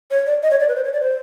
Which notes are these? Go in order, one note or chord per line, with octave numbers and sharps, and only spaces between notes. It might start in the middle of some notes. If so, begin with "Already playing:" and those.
C#5
D5
D#5
C#5
D5
B4
C5
C#5
D5
C5